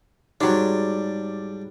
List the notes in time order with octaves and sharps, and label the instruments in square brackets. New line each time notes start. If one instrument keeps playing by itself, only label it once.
[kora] G#2 F#3 [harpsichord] G3 D4